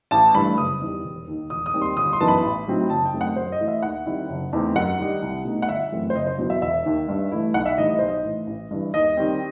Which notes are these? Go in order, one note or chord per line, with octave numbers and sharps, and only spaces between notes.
A1 A5
G2 E3 A3 B5
F#1 D#6
E2 D#3 G3
E1
D#2 D#3
E1 D#6
D#6
D#2 D#3 G3 C4
C6
G1 D#6
C6
F#2 E3 B3 D#4 A5
B5
A1
A2 F#3 C4 D#4
F#1 A5
G5
F#2 D#3 A3 C4
F#5
F#2 C5
D#5
E3 A3 E4
E5
D#2 F#5
D#3 G3 C4 E4
F#1
E2 D#3 A3 C4
F#2 F#5
D#3 G3 D#4
C2
B2 A3 D#4
F#5
G1 E5
F#2 E3 A3 C4
C5
F#1 D#5
C5
E2 B2 F#3
E5
E1 E5
D#2 D#3
G2
E3 A3 E4
B1 F#5
E5
A2 E3 G3 D#4 D#5
D#5
B1 C5
D#5
A2 E3
A1
G2 E3
D#2 D#5
D#3 G3 C4